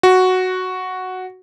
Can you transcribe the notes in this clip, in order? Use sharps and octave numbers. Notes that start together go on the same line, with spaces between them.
F#4